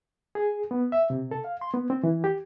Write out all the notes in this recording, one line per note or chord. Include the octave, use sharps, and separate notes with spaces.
G#4
B3
E5
C3
A4
F5
C6
B3
C4
E3
G4